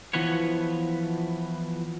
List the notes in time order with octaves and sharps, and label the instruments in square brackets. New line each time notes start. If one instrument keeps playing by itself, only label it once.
[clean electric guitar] E3 F3 B3 B4 C#5